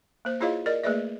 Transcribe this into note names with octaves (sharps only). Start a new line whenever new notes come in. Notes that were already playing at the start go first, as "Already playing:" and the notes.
A#3 C5
E4 F4 G#4 C#5 D#5 F5
A#4 D5 D#5
A3 A#3 G#4 B4 D5 E5